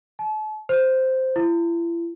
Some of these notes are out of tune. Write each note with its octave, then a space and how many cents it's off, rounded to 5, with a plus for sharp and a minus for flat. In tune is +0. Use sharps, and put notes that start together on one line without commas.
A5 -40
C5 -5
E4 +40